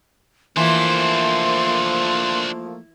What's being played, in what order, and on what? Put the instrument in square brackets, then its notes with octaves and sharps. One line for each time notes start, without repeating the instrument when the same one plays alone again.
[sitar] E3 [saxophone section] F3 A3 A#3 [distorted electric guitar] D4 C5 [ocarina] C6